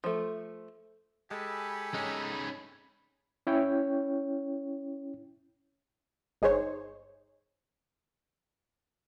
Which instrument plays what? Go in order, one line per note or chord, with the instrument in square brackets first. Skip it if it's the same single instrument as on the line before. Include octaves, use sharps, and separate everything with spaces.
[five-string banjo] F3 A3
[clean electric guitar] G#3 [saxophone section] G4 A4 [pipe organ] G#5 B5
[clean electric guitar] G#3 [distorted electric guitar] C#4 D#4
[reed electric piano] C#4 E4 C#5 G5
[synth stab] G1 D#4 G#4 C5 C#5